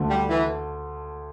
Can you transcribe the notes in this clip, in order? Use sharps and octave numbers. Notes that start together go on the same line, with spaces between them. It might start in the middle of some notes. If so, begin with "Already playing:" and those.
Already playing: D2 D3 A3
G3
E3